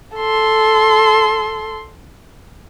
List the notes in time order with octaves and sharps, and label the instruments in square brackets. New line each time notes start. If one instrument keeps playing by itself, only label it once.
[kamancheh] A4 C6